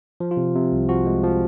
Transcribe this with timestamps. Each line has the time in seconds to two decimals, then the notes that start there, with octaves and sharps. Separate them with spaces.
0.20 F3
0.31 F4
0.37 C3
0.55 C3
0.73 C2
0.89 F3 F#4
1.06 G#3
1.24 F3